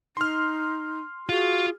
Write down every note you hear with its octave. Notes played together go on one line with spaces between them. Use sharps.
D#4 C6 F6
F4 F#4 G#4